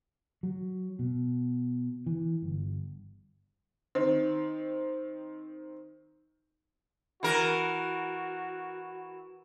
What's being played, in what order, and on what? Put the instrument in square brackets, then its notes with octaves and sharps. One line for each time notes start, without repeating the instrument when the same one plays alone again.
[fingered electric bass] F#3
B2
E3
G1
[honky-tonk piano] D#3 C4
[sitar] E3 A#4 [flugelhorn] F#4